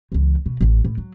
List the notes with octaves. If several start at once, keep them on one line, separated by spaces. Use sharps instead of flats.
C#2 E3
B2
A1 F#2
A2
F#3